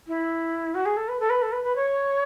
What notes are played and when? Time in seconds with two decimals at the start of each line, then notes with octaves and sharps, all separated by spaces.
0.08 E4
0.75 F#4
0.85 G#4
0.97 A4
1.08 B4
1.20 A4
1.30 B4
1.42 A4
1.52 B4
1.64 B4
1.76 C#5